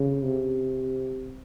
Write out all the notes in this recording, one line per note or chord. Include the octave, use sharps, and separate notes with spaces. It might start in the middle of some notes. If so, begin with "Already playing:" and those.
Already playing: C#3
C3